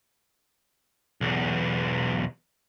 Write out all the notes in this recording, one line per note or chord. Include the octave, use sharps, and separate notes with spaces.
B1 E2